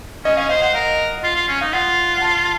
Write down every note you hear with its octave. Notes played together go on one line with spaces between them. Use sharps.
C#4 D#5
C#4 F5
C5 F5
C5 F#5
A#4 F5
F4
F4
C#4
D#4 F5
F4 F#5
F#5
A5